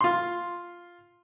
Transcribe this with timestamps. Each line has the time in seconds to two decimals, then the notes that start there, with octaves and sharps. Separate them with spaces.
0.01 F4 C6